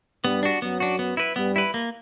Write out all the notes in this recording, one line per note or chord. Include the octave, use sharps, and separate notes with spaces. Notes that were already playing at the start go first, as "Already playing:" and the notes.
G2 G3 B3
D4 F#4
F#2 F#3 B3
D4 F#4
B3
E4 B4
G2 G3 B3
E4 B4
A#3